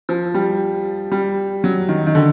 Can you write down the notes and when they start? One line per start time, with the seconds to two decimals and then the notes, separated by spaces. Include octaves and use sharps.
0.09 F3
0.34 G3
1.12 G3
1.64 F#3
1.89 D#3
2.07 D#3
2.15 D3